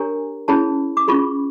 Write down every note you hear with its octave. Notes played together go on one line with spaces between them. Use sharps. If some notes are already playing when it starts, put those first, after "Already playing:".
Already playing: D4 G4 A#4 C#5 G#5 A#5
C#4 E4 G#4 C#5 A5 B5
D6
C#4 F4 G#4 B5 C#6